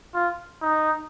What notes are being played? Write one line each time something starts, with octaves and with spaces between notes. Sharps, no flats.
F4
D#4